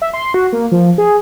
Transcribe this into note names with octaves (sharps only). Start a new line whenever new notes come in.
E5
C6
F#4
A#3
F3
G#4